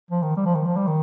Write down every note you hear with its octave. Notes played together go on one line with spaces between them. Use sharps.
F3
D#3
G3
F3
D#3
F3
G3
D#3